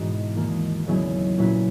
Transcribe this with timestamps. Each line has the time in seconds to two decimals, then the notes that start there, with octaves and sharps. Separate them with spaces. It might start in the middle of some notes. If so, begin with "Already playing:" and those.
Already playing: G#2 B2 E3 B3 D#4 F#4
0.36 D#2 D#3 A#3
0.87 D#2 C#3 F#3 B3 E4
1.38 A#2 F#3 C#4 E4 B4